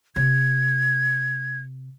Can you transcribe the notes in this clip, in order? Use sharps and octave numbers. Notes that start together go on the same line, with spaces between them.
C3 G#6